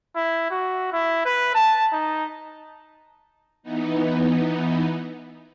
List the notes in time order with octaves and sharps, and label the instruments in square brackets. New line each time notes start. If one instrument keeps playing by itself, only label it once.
[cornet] E4
F#4
E4
B4
A5
D#4
[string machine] E3 B3 D#4